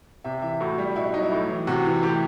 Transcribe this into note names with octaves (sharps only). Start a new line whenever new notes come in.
C3 E5
E3 E5
A2 F#4
G3
B2 E4
F#3 D#4
E4
A2
E3
C3 F#4
E3
A2 G4